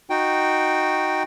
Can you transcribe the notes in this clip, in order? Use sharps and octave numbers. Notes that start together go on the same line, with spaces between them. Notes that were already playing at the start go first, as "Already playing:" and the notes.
D#4 F#4 G5